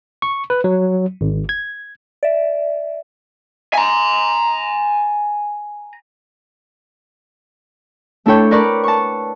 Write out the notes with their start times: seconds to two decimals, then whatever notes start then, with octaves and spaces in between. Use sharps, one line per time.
0.22 C#6
0.50 B4
0.64 F#3
1.21 G#1
1.49 G#6
2.23 D5 E5
3.74 G#5 A#5
8.26 A3 D4 E4 A4 C#5 G5
8.51 A#4 B4 D5 C#6
8.84 A5 C#6